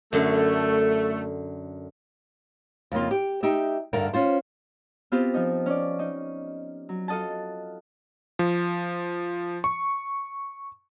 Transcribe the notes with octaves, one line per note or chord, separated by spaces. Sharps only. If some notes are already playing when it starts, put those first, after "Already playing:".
F#2 D3 A3
F2 C#3 A#3 F4
G4
D#4 G4 E5
D2 G2 D3 A#4 F5
C#4 F4 C5
B3 C4 F4 G4
F3 D#4
C#4 D5
D#4
F#3
F4 A4 D#5 F#5 A5
F3
C#6